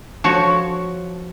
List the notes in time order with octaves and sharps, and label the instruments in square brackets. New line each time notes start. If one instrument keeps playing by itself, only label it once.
[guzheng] F3 F#4 C#5